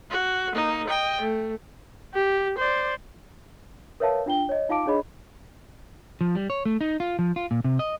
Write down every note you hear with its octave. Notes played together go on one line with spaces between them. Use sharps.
F#4
A#3 D#4
D#5 G5
A3
G4
C5 D5
A#4 B4 C#5 E5 F5 A5
D4 F4 G5 G7
C#5 D#5
D#4 F4 F5 A5 D6 D7
D4 G#4 C#5 D#5 B5
F3
G3
C#5
A3
D#4
F4
F3
F4
A#2
C3
D#5